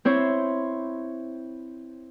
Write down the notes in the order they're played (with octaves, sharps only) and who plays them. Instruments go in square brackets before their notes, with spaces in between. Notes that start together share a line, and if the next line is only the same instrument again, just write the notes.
[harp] C4 E4 C5 C#5